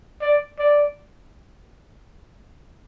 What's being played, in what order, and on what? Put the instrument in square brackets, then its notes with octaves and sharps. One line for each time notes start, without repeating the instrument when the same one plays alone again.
[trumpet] D5
D5